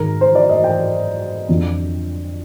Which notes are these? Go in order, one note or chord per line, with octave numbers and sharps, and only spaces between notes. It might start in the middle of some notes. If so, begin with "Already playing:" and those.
Already playing: G#2 D#3 A#4
C5
D5
D#5
G5
F2 D3 F3